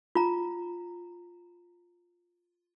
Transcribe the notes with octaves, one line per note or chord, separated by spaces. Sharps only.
F4 A#5